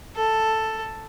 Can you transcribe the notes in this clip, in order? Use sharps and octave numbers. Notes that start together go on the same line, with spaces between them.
A4